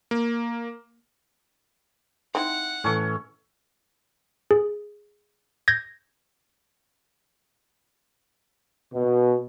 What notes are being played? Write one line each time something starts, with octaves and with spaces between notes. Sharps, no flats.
A#3
C4 D#4 E4 F#5
A2 E3 C#4 A4 C#5
G#4
G6 G#6 A#6
B2